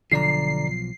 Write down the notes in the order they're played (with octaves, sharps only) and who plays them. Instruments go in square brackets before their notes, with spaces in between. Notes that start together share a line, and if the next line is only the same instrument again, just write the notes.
[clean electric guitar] B1 G2 F3 [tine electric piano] D3 D5 A#5 [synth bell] C7